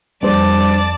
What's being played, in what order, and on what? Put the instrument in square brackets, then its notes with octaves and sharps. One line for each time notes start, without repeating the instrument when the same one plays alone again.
[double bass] F2 [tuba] G3 [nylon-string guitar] D4 C5 [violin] D5 A5